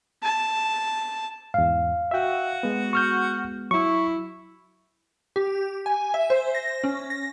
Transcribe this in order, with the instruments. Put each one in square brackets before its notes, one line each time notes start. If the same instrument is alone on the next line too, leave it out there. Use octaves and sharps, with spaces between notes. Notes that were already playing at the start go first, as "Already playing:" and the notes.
[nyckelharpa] A5
[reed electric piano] E2 G#2 [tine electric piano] F5
[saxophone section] F#4 [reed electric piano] E5 G5
[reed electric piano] G#3 B3
[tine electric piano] C#6 F6 G6
[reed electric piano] F#3 [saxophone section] E4 [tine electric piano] C#6
[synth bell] G4
G#5
E5
C5
A#6
C#4
A#6